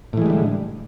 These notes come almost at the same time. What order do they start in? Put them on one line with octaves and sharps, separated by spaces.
A2 E3 G#3 G3 D3